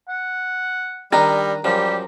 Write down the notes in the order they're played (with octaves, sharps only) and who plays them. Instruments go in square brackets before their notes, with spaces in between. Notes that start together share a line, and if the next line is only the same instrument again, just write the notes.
[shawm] F#5
[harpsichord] D#3 D4 D#4 [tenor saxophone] G3 [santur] A#5
[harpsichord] F#2 F3 [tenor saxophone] G3 [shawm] G4